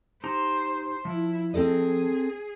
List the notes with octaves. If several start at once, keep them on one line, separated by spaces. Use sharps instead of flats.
D#4 G4 C5 A#5
F3 E4
C4 G#4 A4 D#5